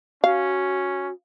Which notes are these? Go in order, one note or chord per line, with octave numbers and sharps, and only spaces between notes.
C#4 F#4 F5